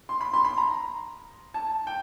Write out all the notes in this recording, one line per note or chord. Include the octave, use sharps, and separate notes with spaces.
C6
B5
C6
B5
A#5
A5
G5